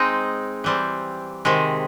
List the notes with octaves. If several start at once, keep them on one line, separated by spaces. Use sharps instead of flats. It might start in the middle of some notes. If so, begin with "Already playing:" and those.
Already playing: G#3 C4 D#4
E3 G3 C4
C3 D#3 G#3